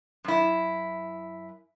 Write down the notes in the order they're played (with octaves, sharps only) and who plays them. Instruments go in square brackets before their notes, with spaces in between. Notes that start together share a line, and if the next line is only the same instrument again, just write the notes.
[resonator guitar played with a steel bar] F#2 E4